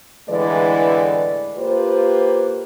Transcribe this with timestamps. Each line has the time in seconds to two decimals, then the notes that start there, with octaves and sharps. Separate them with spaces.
0.30 A2 D3 E3 G#3 B4 D5
1.58 A#3 F4 G4 B4 C5